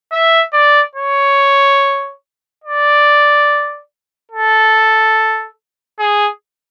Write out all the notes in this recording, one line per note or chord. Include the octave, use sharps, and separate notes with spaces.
E5
D5
C#5
D5
A4
G#4